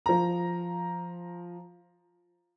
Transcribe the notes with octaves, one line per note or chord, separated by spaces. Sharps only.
F3 A#5